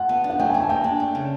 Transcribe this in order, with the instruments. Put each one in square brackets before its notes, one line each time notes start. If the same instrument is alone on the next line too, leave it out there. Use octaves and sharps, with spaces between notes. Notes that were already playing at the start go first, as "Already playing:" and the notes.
Already playing: [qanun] A3 F4 [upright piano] F#5
[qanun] B3
D4
[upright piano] F#5
[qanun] A3 [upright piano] G5
[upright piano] G#5
[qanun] A3
[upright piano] G#5
[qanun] A#3 [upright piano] G5
[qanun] D4
A3
C#3